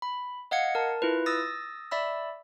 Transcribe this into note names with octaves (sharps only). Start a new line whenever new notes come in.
B5
D#5 F5 F#5 G#6 C#7
A#4 A5
E4 F4 B4
D#6 E6 A6 A#6
D5 E5 B5 E6